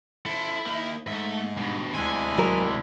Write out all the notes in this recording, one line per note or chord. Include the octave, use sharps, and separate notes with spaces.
E4 A4 C5
A#3 D#4
G#2 A3 E5
G2 B2
D2 C3 G#3 E4 G#5
F#3 A#4